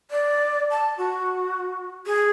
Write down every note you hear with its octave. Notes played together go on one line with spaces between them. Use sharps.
D5
A5
F#4
G#4